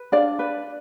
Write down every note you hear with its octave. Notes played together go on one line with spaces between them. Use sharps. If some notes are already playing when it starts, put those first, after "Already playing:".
Already playing: B4
D4 D5 F5
B4